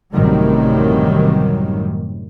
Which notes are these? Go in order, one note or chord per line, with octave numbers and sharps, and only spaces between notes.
A1 F#2 C3 D#3 F#3 G3